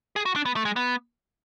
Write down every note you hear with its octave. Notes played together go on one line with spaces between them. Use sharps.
G#4
F#4
D4
B3
A3
G#3
B3